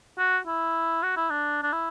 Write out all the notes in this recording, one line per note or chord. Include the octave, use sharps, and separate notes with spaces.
F#4
E4
F#4
E4
D4
D4
E4